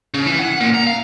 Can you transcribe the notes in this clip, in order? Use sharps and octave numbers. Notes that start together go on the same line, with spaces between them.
C#3
E3
F#5
A#2
A#5
F5